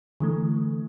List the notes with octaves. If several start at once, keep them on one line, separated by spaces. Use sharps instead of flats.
D3 E3 A3